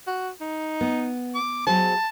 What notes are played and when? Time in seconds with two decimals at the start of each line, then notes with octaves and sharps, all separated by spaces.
0.07 F#4
0.41 D#4
0.81 B3
1.35 D6
1.67 F#3 G#4 C5 A5